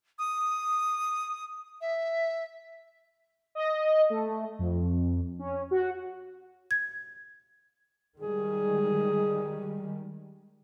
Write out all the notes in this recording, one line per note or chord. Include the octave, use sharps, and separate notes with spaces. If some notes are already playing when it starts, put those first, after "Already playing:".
D#6
E5
D#5
A3
F2
C#4
F#4
G#6
D#3 G3 G#3 G#4